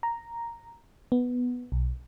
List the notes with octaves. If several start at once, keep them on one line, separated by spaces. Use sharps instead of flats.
A#5
B3
B1